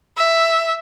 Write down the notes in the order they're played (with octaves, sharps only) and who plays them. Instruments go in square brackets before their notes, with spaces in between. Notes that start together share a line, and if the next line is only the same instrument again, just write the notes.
[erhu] E5